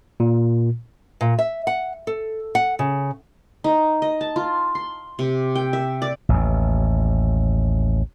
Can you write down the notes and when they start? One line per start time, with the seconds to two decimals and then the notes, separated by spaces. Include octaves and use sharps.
0.20 A#2
1.21 A#2
1.39 E5
1.67 F#5
2.07 A4
2.55 F#5
2.79 C#3
3.64 D#4
4.02 D#5
4.21 A5
4.36 F4
4.75 C6
5.19 C3
5.55 G5
5.73 E5
6.02 D5
6.29 A1 D#2